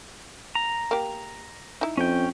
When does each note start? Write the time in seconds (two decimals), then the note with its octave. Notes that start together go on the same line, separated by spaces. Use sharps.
0.55 A#5
0.91 A#3 G4
1.81 D#4 E4
1.97 F2 C#4 G5